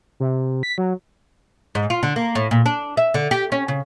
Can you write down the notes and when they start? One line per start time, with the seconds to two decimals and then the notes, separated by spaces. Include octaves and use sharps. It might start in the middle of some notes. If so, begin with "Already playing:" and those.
0.20 C3
0.63 B6
0.78 F#3
1.75 G#2
1.90 F4
2.03 D3
2.16 A#3
2.35 A2
2.51 A#2
2.66 D4
2.97 E5
3.14 D3
3.31 G4
3.52 C#4
3.68 C#3